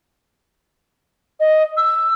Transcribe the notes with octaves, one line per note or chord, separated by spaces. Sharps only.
D#5
E6